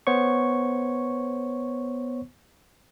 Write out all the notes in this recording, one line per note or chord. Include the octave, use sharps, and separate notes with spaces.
B3 C5 C#5 C#6